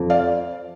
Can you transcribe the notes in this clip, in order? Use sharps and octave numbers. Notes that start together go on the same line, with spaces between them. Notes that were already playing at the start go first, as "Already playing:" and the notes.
Already playing: F2
D5 F5